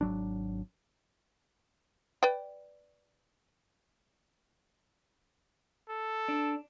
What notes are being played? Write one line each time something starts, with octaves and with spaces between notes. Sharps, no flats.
G#1 F#3 D4
B4 D5 G5
A4
D4